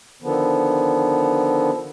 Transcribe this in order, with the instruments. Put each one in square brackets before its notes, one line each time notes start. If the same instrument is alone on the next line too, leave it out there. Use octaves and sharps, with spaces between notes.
[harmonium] D3 D#3 F3 B3